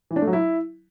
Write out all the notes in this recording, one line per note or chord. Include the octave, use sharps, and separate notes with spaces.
E3
D4
A3
F#3
E4